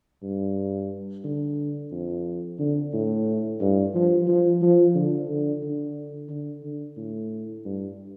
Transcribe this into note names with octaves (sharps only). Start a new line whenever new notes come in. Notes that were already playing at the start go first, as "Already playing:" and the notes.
G2
D3
F2
D3
A2
G2
F3
F3
F3
D3
D3
D3
D3
D3
A2
G2